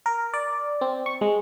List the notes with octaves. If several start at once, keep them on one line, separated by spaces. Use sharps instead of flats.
A#4
D5
C4
C#6
G#3